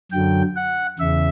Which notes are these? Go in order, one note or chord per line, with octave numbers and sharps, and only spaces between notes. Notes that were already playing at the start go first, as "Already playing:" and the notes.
F#2 D3 F#3 G5
F#5
E2 C#3 E5